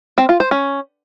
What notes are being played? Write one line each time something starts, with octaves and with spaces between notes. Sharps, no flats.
C4
F4
C5
C#4